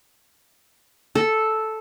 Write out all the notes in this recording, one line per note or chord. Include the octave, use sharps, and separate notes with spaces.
A4